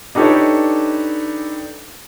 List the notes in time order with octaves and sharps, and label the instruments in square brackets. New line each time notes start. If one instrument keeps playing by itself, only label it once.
[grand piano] D4 D#4 G4 A4 B4 C#5